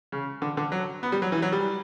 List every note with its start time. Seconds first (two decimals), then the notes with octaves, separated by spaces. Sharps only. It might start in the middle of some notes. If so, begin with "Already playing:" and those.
0.12 C#3
0.42 D3
0.57 D3
0.72 F#3
1.03 B3
1.12 G3
1.22 F#3
1.32 E3
1.42 F#3
1.52 G3